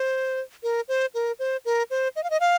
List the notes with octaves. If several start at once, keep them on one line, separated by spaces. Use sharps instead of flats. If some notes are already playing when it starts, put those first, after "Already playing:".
Already playing: C5
A#4
C5
A#4
C5
A#4
C5
D#5
F5
D#5
F5